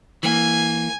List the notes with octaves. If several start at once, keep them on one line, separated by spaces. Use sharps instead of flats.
E3 A#3 G#5